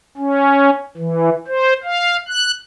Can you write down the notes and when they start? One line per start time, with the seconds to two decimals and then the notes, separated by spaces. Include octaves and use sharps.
0.17 C#4
0.97 E3
1.47 C5
1.84 F5
2.28 F#6